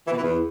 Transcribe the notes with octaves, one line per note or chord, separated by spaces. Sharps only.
E3
B2
E3
E2